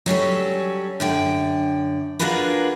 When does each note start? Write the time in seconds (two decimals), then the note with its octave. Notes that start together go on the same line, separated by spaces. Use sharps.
0.06 F#3 G3 C#4 A4
1.00 F#2 D3 G5
2.19 D4 F4 F#4 G#4 A#4 B4